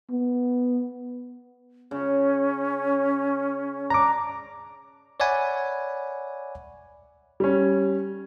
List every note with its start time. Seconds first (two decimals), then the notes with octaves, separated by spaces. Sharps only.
0.11 B3
1.91 C#3 C#4
3.90 D4 A#5 D6
5.20 C#5 D5 E5 F#5 G#5 B5
7.40 G3 C#4